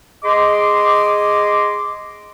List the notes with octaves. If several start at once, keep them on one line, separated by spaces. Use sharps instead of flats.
G#4 D#5 C6 D6